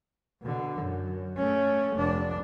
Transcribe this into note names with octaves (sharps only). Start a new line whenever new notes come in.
B2 D3
F#2
A3 C#4
F1 D4